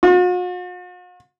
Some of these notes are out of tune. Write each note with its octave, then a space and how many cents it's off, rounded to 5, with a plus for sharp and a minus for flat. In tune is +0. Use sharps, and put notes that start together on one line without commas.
F#4 -45